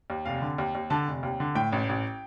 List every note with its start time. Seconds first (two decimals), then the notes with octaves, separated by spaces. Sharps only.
0.10 D#2
0.25 F1 F5
0.42 D3
0.58 D#2
0.75 D#2
0.90 D3 A5
1.08 F1
1.23 D#2
1.40 D3
1.55 A2 G5
1.72 A1
1.89 A1